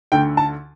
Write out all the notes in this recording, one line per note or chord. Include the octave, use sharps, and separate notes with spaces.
D2 D3 G5
A5